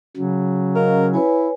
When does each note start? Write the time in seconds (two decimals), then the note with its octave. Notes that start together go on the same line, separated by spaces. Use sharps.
0.16 C#3 F#3
0.75 C#4 A#4 D#5 F5
1.14 E4 B4 C#5 G#5